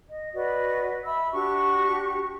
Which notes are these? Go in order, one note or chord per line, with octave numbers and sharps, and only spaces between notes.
D#5
F#4 B4 D5 D#5
E5 B5 E6
D4 F#4 G4 C#6